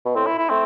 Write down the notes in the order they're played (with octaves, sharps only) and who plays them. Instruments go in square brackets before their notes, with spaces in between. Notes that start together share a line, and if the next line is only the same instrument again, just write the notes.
[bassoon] B2
[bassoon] A2 [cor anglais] C4
[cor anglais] E4
E4
[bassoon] A3 [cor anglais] C4